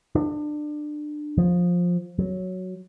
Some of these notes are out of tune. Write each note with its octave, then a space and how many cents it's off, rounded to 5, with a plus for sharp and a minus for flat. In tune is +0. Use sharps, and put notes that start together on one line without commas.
D4 +25
F3 +15
F#3 +0